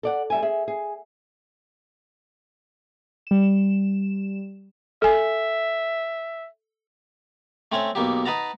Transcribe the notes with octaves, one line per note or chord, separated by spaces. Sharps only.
A4 D5 F#5
G3 E5 G#5
G#4 E5
G#4
G3 E7
A4 E5 G#5
A3 C4 C#4 C#5
B1 B2 A#3 G4
D#4 B4 F#5 A5 A#5